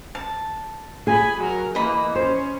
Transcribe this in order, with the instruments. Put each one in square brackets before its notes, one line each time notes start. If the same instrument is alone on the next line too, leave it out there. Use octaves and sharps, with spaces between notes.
[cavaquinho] A5
[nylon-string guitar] G#4 [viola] G#5 B5
[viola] F#3 A#4
[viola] E3 A#3 [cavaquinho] D#5 B5
[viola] C#4 [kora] C5